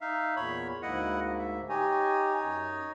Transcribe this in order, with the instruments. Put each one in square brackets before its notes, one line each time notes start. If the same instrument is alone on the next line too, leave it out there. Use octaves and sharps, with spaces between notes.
[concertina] D#4 E5 F5
[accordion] E2 A#2 [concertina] C#5 B5
[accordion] D2 G#2 A#3 [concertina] E4 D#5 F#5
[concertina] E5
[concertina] D#4 C#5 D#5 [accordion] G4 G#5
[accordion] F#2